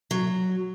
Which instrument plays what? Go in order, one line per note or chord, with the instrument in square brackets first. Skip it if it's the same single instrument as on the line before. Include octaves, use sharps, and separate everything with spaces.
[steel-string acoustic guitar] F#3